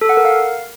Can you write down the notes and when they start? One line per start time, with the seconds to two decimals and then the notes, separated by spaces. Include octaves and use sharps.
0.01 A4
0.09 F#5
0.17 A#4
0.25 F5